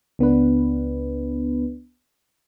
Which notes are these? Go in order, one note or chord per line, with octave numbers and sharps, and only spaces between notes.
C#2 B3 D4 B4